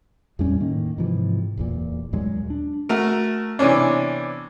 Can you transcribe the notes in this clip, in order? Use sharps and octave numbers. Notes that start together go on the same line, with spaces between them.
E2 A2 G3 C#4
A2 D#3 A#3
G#2 C3 E3 F3
D1 E2 A#2
D#2 A#2 F#3 G#3
D4
A3 F#4 A#4
C3 E3 B3 C#4 D4